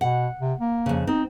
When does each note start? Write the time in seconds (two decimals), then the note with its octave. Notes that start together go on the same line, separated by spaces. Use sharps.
0.01 B2 F#5
0.40 C3
0.60 A#3
0.86 F2 C#3
1.07 C4 D#4